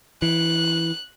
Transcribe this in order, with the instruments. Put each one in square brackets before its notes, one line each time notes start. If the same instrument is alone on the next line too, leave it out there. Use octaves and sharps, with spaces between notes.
[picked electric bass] E3 [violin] F#6